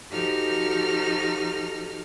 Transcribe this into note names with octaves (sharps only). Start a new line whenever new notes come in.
F3 D#4 F#4 G4 A4 F6